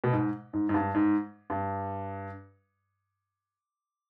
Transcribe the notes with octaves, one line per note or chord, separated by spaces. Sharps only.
B2
G#2
G#2
G#2
G2
G#2
G2